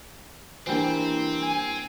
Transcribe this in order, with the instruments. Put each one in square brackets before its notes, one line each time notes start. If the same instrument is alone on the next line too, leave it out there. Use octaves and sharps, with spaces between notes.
[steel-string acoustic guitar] E3 G3 A#3 [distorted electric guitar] C4 [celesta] D4 E4 C5
[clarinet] G#5